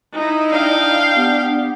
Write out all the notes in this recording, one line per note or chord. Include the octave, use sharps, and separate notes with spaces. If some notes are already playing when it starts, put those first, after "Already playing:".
D#4 E4
D4 F5 G5
B3 G4